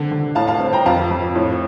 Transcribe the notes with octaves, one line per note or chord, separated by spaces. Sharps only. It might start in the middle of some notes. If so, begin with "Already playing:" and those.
Already playing: D3 C4
D3
A2 F5 A5
F5 A5
C4
G5 A#5
F2 F5 A5
F2
A2